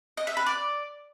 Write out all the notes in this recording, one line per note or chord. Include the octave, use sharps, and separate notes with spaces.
D#5
E5
B4
D5